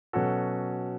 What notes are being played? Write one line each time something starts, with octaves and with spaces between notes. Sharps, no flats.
B2 F#3 C#4 F#4 A4